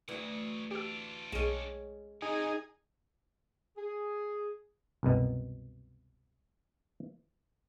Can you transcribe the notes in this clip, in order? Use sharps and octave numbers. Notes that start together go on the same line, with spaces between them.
D2 E3 F#3 G#4
D4 F4 G4 E6
B1 G#3 C#4 D#7
F2 D3 D#4 G#4
G#4
C2 F#2 B2